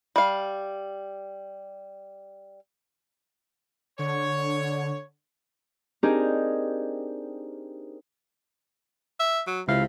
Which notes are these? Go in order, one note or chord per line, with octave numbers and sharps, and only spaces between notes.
G3 F5
D3 C#5
C4 D4 D#4 G4 G#4 A#4
E5
F#3
C#2 C3 E4 F5